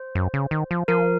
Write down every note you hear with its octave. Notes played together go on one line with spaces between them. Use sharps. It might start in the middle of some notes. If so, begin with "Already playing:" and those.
Already playing: C5
F#2
C#3
D#3
F3
F3 A#4